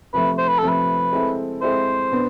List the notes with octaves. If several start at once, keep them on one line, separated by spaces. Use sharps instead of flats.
C3 F3 A3 B4
C5
B4
C3 F3 A3 A4
B4
G#3 C4 E4 A4
G#3 C4 E4 A4 C5
B2 B3 D4